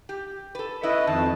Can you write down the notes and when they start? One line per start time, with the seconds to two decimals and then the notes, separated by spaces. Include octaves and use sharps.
0.09 G4
0.55 A4 B4
0.83 C#4 E4 B4 D#5 E5
1.07 F2 D#3 A5